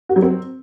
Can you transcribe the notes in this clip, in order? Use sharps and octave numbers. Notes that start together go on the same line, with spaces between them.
F#4
F#3
C4